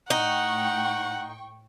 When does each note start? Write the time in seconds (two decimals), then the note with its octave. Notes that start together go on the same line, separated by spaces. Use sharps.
0.10 A2 D#4 F#5 G5 C#6